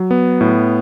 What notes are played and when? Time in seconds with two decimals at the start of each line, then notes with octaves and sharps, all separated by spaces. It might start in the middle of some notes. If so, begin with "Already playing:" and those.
Already playing: F#3
0.11 B3
0.41 A2